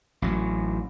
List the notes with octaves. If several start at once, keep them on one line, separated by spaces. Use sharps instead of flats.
A1 F#3